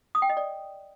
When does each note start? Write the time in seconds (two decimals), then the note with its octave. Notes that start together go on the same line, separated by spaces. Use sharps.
0.15 D#6
0.22 G5
0.29 D#5
0.37 D5